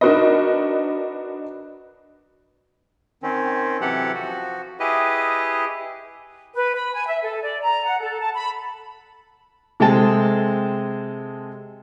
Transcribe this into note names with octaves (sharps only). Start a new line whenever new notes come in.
D4 D#4 F#4 A#4 B4 D#5
D#3 C4 C#4
C3 E3 F#3 G4 A4 F#5
F3 F#4
E4 G4 G#4 B4 D#5
B4
B5
G#5
E5
A4
D5
A#5
F#5
A4
A5
B5
C3 G#3 G#4 A4 G5 A5